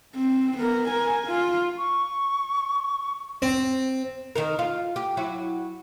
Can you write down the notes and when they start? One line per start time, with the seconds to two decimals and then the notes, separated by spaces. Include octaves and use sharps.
0.16 C4
0.58 B3 A#4
0.88 A#4 G#5
1.28 F4
1.78 C#6
3.42 C4
4.36 D#3 D#4 A#4
4.59 F4
4.96 G4
5.17 F#3 E4 F#4